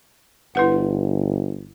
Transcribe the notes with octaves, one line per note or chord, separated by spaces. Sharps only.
G1 E4 B4 F#5